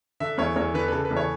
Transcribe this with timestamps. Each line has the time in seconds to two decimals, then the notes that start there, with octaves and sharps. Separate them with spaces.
0.20 D3 E5
0.38 E2 C#5
0.56 E2 C#5
0.74 D3 B4
0.88 B4
0.92 C#3 A4
1.05 B4
1.11 E2
1.17 C#5